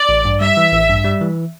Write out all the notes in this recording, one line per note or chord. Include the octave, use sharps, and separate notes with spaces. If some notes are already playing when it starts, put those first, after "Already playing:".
Already playing: D5
A1
G2
G3 E5
E3
A1
G2
G3
E3